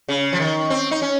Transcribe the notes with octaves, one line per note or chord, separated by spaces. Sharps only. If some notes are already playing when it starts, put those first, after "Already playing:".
C#3
F3
D#3
C4
D#4
C#4